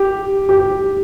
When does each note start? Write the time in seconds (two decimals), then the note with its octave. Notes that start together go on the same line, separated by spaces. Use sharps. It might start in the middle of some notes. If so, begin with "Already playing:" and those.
Already playing: G4
0.49 G4